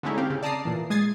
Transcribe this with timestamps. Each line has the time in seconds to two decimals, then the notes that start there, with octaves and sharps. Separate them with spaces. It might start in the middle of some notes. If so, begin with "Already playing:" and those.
0.03 D3 G#3 A3 C#4 D#4 E4
0.18 C4 G4 F5
0.30 C#3
0.43 D5 A5 A#5 D#6 C7
0.65 A#2 E3
0.90 G#3 D#6 G#6 A6 C7